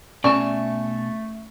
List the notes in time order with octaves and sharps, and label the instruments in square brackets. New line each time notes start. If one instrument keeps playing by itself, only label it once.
[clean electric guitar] B2 G#5 A5 [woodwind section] A3 [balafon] C#4 D5 [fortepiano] C#6